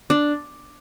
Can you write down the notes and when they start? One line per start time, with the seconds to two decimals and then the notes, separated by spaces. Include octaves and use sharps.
0.10 D4